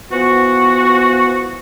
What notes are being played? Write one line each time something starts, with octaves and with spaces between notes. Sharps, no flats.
E3 F3 B3 F#4